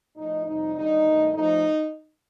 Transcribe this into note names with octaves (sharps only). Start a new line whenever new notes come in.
A2 F3 A3 D#4
F2 C3 G3 D#4
D#2 D3 G3 D#4
G2 D#3 A3
A2 F3 A3 D#4